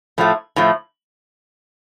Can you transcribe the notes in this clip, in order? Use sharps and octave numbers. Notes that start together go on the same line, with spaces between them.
A2 F3 A3
A2 F3 A3